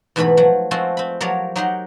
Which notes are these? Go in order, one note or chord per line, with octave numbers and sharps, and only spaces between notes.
E2 G#2 B2 E3 A3 B5
F3 F#3
F3 G#3 A3 C4 F4 F#4
C4 B5
F3 F#3 G4 A#4 C#5 D5
F#3 D#4 G4 A#4 F#5 C6